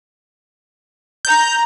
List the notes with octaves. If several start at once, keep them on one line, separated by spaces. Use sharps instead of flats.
A#5 G6